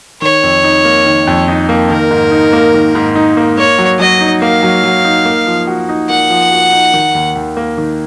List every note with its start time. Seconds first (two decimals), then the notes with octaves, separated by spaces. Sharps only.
0.22 D#3 C#5
0.43 F2
0.64 D#4
0.85 A#3
1.06 D#3
1.27 F2
1.48 D#4
1.69 A#3
1.90 D#3 A#4
2.11 G#2
2.31 D#4
2.53 A#3
2.74 D#3
2.95 G#2
3.16 D#4
3.37 A#3
3.57 A#3 C#5
3.78 F#3
3.99 F#3 D#5
4.21 D#4
4.41 A#3 F5
4.63 F#3
4.84 F#3
5.04 D#4
5.26 A#3
5.47 F3
5.67 F#4
5.89 D#4
6.10 A#3 F#5
6.30 F3
6.51 F#4
6.72 D#4
6.94 D#3
7.15 D#2
7.35 D#2
7.57 A#3
7.78 D#3